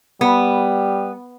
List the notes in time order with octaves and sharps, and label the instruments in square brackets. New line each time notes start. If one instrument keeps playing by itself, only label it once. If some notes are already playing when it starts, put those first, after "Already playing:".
[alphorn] G3 [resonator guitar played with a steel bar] B3